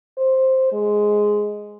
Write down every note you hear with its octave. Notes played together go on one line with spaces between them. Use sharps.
C5
G#3